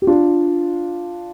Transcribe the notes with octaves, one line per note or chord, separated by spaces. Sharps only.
G4
D4 F4